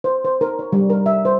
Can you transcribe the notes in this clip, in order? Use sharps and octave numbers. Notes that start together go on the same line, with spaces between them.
C5
C5
A#4
C#5
G3
A#4
E5
C5